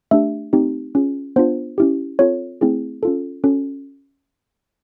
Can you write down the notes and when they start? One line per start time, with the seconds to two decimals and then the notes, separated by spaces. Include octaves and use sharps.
0.11 A3 D4 G4 E5
0.53 A3 C4 D#4 G4
0.95 C#4 F4 G#4
1.36 B3 D4 F4 C5
1.78 C#4 E4 G4
2.19 C4 F4 A4 C#5
2.61 A3 C4 E4 G#4
3.03 C#4 F4 A4
3.44 C#4 F#4 A4